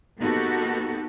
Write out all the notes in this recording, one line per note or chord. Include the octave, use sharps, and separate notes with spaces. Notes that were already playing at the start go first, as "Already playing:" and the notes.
A#3 B3 D#4 F#4 G4 A4